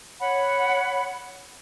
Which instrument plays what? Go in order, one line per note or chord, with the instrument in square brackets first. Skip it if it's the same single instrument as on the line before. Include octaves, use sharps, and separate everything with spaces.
[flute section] C#5 F#5 B5